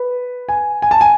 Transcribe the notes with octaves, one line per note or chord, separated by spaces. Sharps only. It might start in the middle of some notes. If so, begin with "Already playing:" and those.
Already playing: B4
G#5
G#5
A5
G#5